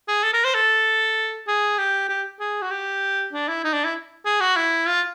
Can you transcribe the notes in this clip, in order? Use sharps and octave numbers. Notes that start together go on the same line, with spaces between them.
G#4
A4
A#4
C5
A4
G#4
G4
G4
G#4
F#4
G4
D4
E4
D#4
D4
E4
G#4
F#4
E4
F4